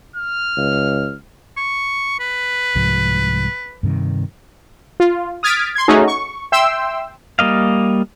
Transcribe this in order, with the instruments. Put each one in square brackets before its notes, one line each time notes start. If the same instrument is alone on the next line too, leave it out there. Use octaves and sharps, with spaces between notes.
[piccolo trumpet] F6
[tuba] C#2
[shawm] C#6
B4
[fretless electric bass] C2 G#2 F3
G2 C3 D#3
[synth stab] F4
D#6 F6 G#6 A6 B6 D7
C6 G#6
A3 C#4 D#4 F#4 G#4
C#6
E5 G5 C6 E6
[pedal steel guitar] G3 A#3 D#5 F5